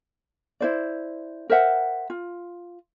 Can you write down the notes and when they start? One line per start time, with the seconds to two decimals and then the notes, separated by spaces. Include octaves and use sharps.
0.60 E4 C5 D5
1.50 A#4 C5 E5 F#5
2.10 F4